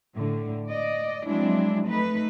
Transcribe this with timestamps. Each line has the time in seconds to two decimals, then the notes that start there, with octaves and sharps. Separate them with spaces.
0.15 A2 D3
0.69 D5 D#5
1.27 F3 F#3 G#3 C4 D4 E4
1.87 A3 D#4 B4